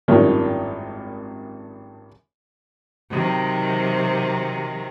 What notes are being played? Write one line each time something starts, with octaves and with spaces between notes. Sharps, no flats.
G#1 F#2 A2 D#3 F3 G3
C3 D#3 F#3